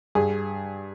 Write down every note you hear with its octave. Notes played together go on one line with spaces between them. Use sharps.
G2 G#4